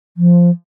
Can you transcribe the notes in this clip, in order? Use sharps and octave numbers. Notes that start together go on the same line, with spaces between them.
F3